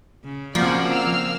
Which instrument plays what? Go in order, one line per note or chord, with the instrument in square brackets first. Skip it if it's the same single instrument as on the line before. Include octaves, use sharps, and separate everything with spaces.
[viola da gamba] C#3
[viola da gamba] C#3 F4 D5 [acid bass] F3 [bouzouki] A#3 [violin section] C4 F#4 F#5
[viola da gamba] C4 [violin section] F5 E6 F6